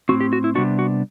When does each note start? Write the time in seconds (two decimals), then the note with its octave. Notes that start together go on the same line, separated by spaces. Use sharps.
0.09 A2 G3 C4 F#4
0.21 G4
0.33 F#4
0.44 E4
0.55 C3 G3 B3 D4 F#4
0.79 F#4